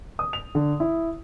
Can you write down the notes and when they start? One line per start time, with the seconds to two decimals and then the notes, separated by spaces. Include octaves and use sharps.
0.19 D#6
0.33 F7
0.55 D3
0.80 E4